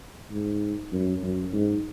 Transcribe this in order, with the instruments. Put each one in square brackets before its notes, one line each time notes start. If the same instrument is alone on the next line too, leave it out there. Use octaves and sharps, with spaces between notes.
[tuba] G#2
F#2
F#2
G#2